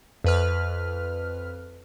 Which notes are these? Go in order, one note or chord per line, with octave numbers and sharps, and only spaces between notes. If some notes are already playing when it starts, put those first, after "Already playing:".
F2 B4 F6